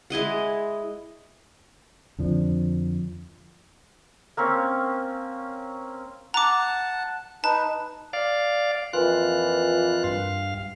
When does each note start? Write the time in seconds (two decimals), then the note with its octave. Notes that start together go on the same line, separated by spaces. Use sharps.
0.10 G#3 E4 D#5 F#5
2.19 F2 D3 F3 D4
4.37 A#3 C4 C#4
6.34 F#5 A5 A#5 D6
7.44 D#4 B4 A5
8.13 D5 F5
8.93 F2 A#2 E3 F4 F#6
10.04 G2 F5